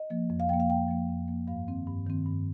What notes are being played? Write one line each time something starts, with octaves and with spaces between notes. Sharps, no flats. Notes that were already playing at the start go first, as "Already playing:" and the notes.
Already playing: D#5
F3 A#3
F2
F5
F3 A#3 G5
F5
F2 G5
F3 A#3
F2
F3 A#3
G2 F5
D#3 C4
G2
D#3 C4
G2